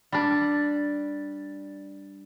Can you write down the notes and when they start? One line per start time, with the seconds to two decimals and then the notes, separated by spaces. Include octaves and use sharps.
0.12 G3 D4